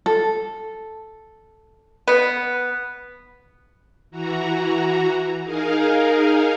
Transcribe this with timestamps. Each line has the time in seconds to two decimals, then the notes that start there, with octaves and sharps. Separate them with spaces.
0.06 A4
2.08 B3
4.11 E3 F#4 A#5
5.43 D#4 G#4 A#4 F5